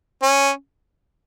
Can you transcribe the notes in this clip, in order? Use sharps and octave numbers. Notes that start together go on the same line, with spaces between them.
C#4